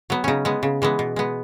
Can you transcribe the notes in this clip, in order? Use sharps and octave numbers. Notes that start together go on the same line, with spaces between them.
F#3 B3
C#3 C#4 D#4
G#3 B3
C#3
E3 G#3 B3
B2
G#3 B3